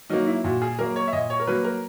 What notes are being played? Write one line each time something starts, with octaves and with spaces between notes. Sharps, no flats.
F#3 A#3 D#4
E4
A#2 F#4
G#4
F#3 A#3 A#4
C#5
E5
A#2 D#5
C#5
A#4
F#3 A#3 B4
A#4